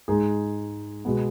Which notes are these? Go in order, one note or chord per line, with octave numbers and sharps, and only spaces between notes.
G#2 G#3 D#4 G#4
B2 G#3 B3